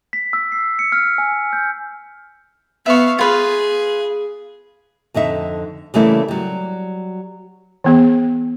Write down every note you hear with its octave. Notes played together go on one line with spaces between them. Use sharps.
B6
E6
C7
C#7
F6
G#5
G6
B3 E5 F5 C#6
F4 G#4 B4 F5
F2 D3 D#4 E5
C#3 E3 G3 A3 A#3 E4
F#3 G3
E3 B3 G#4